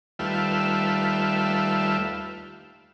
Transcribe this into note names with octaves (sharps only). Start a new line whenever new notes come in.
D#2 G3 A3 F4 B4 E5